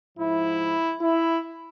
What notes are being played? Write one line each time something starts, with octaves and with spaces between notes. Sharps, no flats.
G#2 F3 E4
E4